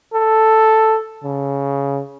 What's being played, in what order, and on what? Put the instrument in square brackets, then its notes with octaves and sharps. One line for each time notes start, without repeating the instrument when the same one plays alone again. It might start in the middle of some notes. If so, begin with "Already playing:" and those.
[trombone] A4
C#3